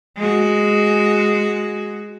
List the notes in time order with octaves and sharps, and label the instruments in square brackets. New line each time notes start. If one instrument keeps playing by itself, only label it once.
[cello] G#3 F#4